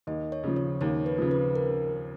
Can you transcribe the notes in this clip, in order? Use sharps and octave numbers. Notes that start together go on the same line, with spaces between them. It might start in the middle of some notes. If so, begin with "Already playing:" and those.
D#2 D#5
C#5
C#3 F3
C#5
D#2 C#5
B4
C#3 F3
B4
A#4